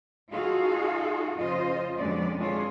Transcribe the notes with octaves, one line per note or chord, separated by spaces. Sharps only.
D#4 F4 F#4 G#4 A4 F5
F2 C#3 F4 C5 D#5
F2 B2 D3 G#3 C#4 D5
E3 G#3 D4 F4 G#4 C#5